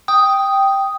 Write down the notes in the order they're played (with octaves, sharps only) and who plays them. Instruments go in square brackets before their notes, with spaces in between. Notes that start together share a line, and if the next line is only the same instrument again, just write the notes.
[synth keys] G5 [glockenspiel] D#6